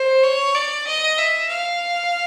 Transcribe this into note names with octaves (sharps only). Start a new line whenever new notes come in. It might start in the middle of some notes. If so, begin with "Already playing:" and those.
Already playing: C5
C#5
D5
D#5
E5
F5